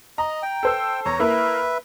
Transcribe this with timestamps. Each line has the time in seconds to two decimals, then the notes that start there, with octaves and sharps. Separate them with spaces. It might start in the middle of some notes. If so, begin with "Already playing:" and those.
0.18 D#5 A#5
0.43 G5
0.63 A4 C5 E6
1.05 E2 C#5 A#5
1.20 A#3 E4 A#4 B4 E5